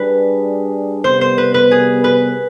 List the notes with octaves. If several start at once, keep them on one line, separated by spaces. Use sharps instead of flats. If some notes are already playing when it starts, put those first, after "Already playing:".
Already playing: G3 D4 G#4 B4
C3 G3 B3 C5
C5
B4
B4
G#4
B4